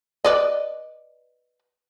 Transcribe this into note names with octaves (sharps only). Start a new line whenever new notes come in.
B4 D5 D#5